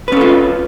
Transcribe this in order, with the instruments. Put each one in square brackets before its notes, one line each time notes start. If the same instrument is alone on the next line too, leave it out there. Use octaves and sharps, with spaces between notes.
[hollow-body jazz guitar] B4
C#4
A4
F4